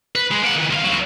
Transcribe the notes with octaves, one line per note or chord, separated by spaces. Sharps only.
B4
G#3
A#3 F#5
D#3 E3
C2 F5
C#2 F#3